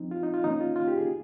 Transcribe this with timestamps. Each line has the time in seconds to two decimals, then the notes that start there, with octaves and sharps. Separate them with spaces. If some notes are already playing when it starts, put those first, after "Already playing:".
Already playing: F3 C4 D#4
0.11 F4
0.23 D#4
0.34 F4
0.44 D#3 A#3 C#4 D#4
0.61 F4
0.76 F4
0.88 G4
0.97 G#4